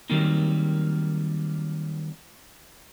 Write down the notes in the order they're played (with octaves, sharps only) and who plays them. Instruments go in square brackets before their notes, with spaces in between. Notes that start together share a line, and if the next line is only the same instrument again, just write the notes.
[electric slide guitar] D#3 F#3 G3 A#3 C4 D#4